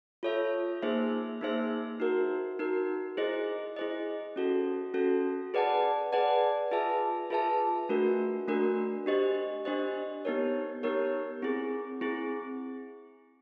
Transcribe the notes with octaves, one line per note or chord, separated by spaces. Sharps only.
F4 A4 C#5 E5
A#3 D#4 G#4 C5 E5
A#3 D#4 G#4 C5 E5
D#4 F#4 A#4
D#4 F#4 A#4
E4 G#4 C5 D#5
E4 G#4 C5 D#5
C#4 F#4 A4
C#4 F#4 A4
G#4 B4 D5 F#5 A5
G#4 B4 D5 F#5 A5
F4 G#4 B4 E5 A5
F4 G#4 B4 E5 A5
A3 D4 F#4 A#4
A3 D4 F#4 A#4
D4 G4 C5 D#5
D4 G4 C5 D#5
B3 D#4 G4 A#4 C#5
B3 D#4 G4 A#4 C#5
C4 E4 G#4
C4 E4 G#4